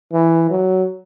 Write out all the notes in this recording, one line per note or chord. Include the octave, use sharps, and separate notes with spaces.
E3
F#3